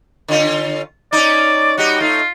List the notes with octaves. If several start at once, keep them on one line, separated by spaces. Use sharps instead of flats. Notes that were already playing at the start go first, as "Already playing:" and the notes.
D3 C#4 F4
C#4 D#4 D5
G3 D#4 F#4 G4
A3 D#4 F4